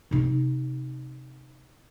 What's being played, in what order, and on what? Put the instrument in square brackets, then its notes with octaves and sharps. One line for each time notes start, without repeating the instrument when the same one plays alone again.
[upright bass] C3 D#4